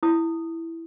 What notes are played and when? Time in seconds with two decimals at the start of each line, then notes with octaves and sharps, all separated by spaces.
0.03 E4 D#6